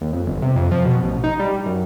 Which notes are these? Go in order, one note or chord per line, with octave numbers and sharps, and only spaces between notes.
D#2
F2
G1
C3
F2
F3
B2
A1
D#4
G3
F#2